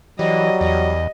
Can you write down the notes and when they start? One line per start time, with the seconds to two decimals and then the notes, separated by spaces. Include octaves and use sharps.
0.19 E3 F#3 G3 D#5
0.61 E2 D#5